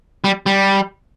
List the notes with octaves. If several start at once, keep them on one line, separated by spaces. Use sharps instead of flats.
G3
G3